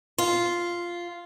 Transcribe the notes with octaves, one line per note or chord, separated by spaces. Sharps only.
F4